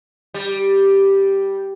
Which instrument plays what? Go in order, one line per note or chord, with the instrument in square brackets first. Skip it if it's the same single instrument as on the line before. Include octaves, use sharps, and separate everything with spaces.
[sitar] G3